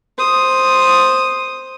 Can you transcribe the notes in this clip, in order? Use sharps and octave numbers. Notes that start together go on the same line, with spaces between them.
C5 D#6